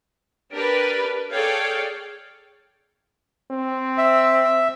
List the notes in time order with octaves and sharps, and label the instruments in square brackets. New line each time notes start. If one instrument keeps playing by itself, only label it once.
[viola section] D4 G4 A#4 B4 D5
G#4 A4 C#5 D5 F5 G5
[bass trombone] C4
[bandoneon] E5